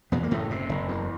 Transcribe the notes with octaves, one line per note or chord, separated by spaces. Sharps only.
E2 B2 B3
A#3
F#1 A2 A3
C3
F#1
E2